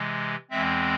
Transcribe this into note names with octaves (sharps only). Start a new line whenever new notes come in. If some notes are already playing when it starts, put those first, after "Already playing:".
Already playing: C3 E3 G#3
E2 E3 G#3 C4 E5